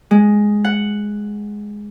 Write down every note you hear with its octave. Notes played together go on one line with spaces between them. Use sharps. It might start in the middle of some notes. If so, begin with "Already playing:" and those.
G#3
F#5